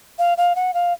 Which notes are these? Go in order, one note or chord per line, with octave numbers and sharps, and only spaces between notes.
F5
F5
F#5
F5